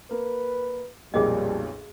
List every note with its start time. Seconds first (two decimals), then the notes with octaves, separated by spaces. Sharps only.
0.11 A#3 B4
1.14 B1 F2 A#2 G3 G#4 D#5